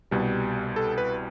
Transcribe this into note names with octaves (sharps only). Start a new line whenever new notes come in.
C2 B2 G3
A4
B4